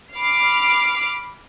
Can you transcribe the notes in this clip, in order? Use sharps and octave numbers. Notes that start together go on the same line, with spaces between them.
B5 D6 F6 C7